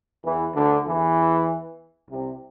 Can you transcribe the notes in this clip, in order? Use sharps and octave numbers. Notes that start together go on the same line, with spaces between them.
E2 E3
D2 D3
E2 E3
C2 C3